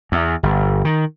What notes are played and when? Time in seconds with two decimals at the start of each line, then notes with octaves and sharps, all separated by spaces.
0.12 E2
0.43 G1
0.85 D#3